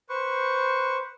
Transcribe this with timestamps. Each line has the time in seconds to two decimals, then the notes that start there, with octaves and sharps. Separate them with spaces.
0.09 B4 C5 C#6